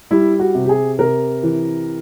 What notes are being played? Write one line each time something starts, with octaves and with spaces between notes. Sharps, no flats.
G3 E4
F#4
C3
G4
G#4
C3 A#4
E3